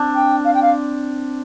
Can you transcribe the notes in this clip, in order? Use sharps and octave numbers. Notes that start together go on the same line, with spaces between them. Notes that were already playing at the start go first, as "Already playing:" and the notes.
Already playing: C4 D4
G5
F5
G5
F5